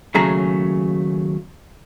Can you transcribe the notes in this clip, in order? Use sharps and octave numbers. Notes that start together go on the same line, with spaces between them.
D#2 C#3 F#3 A3 G#4 A#5